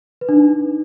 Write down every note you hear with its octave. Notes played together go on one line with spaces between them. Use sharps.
B4
D4
D#4